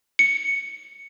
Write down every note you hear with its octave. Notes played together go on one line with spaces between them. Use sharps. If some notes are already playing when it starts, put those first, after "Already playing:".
C#7